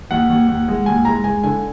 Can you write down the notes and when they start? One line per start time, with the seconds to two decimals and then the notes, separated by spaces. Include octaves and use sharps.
0.11 D#2 F#5
0.30 D#2
0.48 D#2
0.68 G#3
0.86 D#2 G#5
1.05 G#3 A#5
1.24 G#3 G#5
1.43 D3 G#5